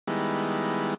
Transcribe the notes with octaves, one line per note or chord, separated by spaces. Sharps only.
D#3 G3 G#3 B3 E4